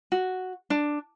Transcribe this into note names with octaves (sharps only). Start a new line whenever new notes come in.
F#4
D4